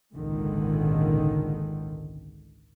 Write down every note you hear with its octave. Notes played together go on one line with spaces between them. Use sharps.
G#1 C#2 A#2 D3 D#3